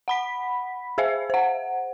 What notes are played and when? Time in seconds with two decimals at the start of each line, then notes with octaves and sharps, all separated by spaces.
0.08 F#5 B5 B6
0.98 G#4 C5 E5 F5
1.30 C5 F#5